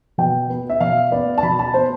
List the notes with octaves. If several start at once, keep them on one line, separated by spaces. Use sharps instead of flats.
B2 G5
B3
E5
B2 F5
B3 D5
A5
B2 B5
A5
B3 C5